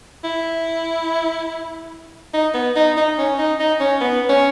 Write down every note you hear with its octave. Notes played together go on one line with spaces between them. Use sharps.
E4
D#4
B3
D#4
D#4
C#4
D#4
D#4
C#4
B3
C#4